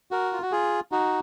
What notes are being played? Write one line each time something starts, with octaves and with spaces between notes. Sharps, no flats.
F#4 A#4
F4
F#4
F4 G#4
D#4 F#4